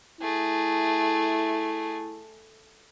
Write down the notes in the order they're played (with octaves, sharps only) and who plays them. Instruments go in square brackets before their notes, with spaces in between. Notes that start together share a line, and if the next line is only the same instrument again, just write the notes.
[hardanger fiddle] A3 G#4 [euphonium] E4